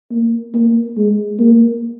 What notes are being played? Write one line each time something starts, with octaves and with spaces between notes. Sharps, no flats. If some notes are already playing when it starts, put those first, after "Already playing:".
A#3
A#3
G#3
A#3